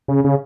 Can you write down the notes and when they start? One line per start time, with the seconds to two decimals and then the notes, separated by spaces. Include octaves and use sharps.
0.08 C#3
0.24 C#3